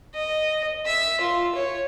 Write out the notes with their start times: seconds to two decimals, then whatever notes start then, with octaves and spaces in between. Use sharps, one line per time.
0.14 D#5
0.86 E5
1.21 F4
1.55 C#5